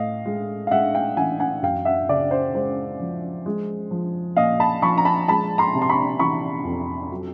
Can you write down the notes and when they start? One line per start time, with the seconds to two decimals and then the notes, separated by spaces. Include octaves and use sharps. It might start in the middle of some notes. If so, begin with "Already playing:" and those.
Already playing: A2 D#5 F5
0.26 G#3
0.67 F5
0.71 G#3 E5 F#5
0.95 F5 G5
1.17 E3 F#5 G#5
1.40 F#5 G#5
1.63 F#2 F5 G5
1.85 E5 F#5
2.09 C#3 D5 E5
2.31 C5
2.54 G#3 C5
3.00 F3
3.46 G#3
3.91 F3
4.37 A#2 D#5 F5
4.60 A5 B5
4.82 F3 B5 C#6
4.98 A#5
5.05 A5 B5
5.28 G#3 A5 B5
5.58 A#5 C6
5.75 C3
5.82 C6
5.89 B5 C#6
6.19 E3 B5 C#6
6.65 F2
7.11 F#3